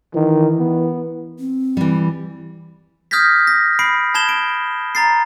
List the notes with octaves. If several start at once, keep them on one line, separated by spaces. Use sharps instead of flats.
D#3 E3
B3
C4
E3 G3
D#6 F6 G6 G#6 A#6 B6
A#6
B5 C7 D7
A5 B5 G#6 E7 G7
D7
A#5 A6 C7